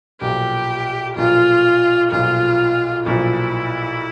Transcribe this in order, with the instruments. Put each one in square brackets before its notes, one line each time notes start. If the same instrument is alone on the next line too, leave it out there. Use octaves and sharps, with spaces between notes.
[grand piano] B1 A#2 F3 [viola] G4
[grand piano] B1 A#2 F3 [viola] F4
[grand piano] B1 A#2 F3 [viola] F4
[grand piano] B1 A#2 F3 [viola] E4